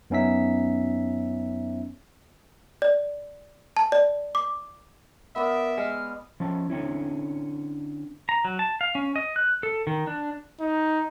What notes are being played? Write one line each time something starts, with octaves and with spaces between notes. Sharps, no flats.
F#2 B3 C#4 D#4 E5 B6
D5
A5
D5
D6
B3 A#4 D5 E5
G#3 F6
F3 C#4 A5
D3 C4 C#4 E4
A#5
F#3
A5
F5
C#4
D#5
F#6
A4
D#3
D4
D#4